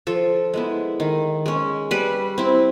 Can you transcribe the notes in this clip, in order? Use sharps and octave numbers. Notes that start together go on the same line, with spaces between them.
F3 A4
G#3 B3 E4
D#3
G#3 C#4
G3 B4
C4 E4